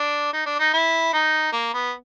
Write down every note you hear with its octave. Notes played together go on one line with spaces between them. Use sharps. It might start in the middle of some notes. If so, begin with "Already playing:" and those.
Already playing: D4
D#4
D4
D#4
E4
D#4
A#3
B3